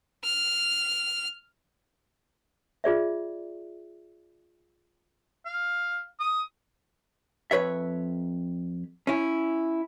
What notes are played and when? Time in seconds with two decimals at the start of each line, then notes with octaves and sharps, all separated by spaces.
0.24 F6
2.84 F4 G#4 D5 E5
5.46 F5
6.20 D#6
7.51 F2 B4 C#5 E5
9.07 C#4 E4